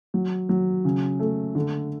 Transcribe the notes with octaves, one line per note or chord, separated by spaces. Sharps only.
F#3
F#3
C#3
A3
D3